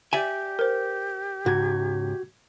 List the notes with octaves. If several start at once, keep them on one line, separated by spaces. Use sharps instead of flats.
G4 D5 E5 G#5
A#4 C5
C#2 G#2 F#4 G#6